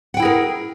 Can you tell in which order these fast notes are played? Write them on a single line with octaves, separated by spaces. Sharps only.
F#5 G5 E4 G#4 A#4